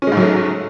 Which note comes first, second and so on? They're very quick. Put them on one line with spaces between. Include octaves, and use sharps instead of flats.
C#4 G#3 G#2 F#3 A3